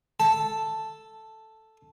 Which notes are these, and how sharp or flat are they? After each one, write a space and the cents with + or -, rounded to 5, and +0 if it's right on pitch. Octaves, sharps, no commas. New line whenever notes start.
A4 +0 A5 +0